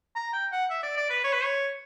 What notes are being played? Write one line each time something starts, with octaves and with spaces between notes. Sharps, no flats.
A#5
G5
F#5
E5
D5
D5
B4
C#5
B4
C#5